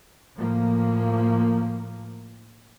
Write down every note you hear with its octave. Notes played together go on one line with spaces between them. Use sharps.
A2 F3 A#3